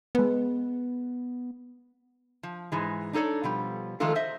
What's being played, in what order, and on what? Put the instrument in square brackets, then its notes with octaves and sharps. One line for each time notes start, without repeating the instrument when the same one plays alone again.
[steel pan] G#3 B4 [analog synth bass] B3
[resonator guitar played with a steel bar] F3
G#2 E3 G#3
D4 D#4 A4 C#5 D5
B2 F3 G3
D#3 F3 G#3 A3 F4 A4
C5 D#5 E5